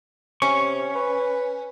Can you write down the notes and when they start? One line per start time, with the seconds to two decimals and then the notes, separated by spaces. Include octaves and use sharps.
0.42 C3 C#4 C#6
0.95 B4